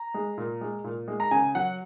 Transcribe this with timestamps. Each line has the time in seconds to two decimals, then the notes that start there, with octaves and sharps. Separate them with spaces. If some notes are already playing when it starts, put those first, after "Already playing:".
Already playing: A#5
0.14 G#3
0.38 A#2
0.61 G#3
0.84 A#2
1.08 G#3
1.20 A#5
1.31 C#3 G#5
1.55 F#3 F#5